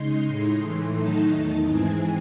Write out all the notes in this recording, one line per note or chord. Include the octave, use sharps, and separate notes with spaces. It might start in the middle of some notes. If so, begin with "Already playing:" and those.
Already playing: C#3 G#3 D#4 C6
A2 G#3 D#4
A2 E3 A3 C6
D#3 F#3 A3 D#4 A5
E2 D#3 A3 D#4 A5
G#2 E3 G#3 C4 G#5